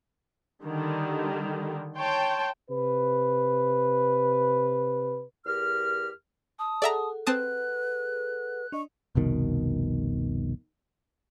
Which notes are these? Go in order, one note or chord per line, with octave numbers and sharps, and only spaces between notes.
D3 D#3 G3
C#5 G5 A5 C6
C3 B4
E2 G4 A#4 F6
A5 D#6
G#4 A4 D5 E5 F#5 A#5
C4 B4 A5 D#6 F#6
D4 D#5 C#6
F1 C2 B2 D#3